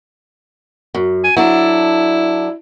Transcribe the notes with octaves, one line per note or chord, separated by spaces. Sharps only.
F#2
G#5
F#3 D4 E4 A4